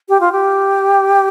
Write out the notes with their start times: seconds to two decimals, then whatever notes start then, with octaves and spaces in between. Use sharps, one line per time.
0.09 G4
0.20 F4
0.32 G4